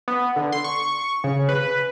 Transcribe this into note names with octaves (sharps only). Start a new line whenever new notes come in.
B3
D3
C6
C#6
C#3
B4